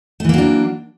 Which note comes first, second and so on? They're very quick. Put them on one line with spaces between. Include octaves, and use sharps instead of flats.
A3 E3 A#3 F#3 D4